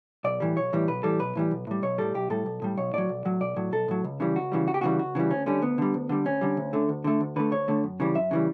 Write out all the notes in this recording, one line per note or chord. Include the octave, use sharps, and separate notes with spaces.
B1 D5
A2 E3 G3
B1 C#5
A2 E3 G3
B1 B4
A2 E3 G3 A4
B1 B4
A2 E3 G3
B1
A2 G3
B1 C#5
A2 G3 A4
B1 G4
A2 G3 A4
B1
A2 G3
B1 C#5
A2 F#3 D5
B1
A2 F#3
B1 D5
A2 F#3
B1 A4
A2 F#3
C#2
C#3 E3 G3
C#2 F#4
C#3 E3 G3
C#2 F#4
G4
C#3 E3 G3 F#4
C#2 F#4
C#3 E3 G3
D2 C#4
D3 G3 C#4
D2 B3
D3 G3
D2
D3 G3
D2 C#4
D3 G3
D2
D3 A3
D2
D3 A3
D2
D3 A3 B4
D2 C#5
D3 A3
F#2
C#3 E3 G3
F#2 E5
C#3 E3 G3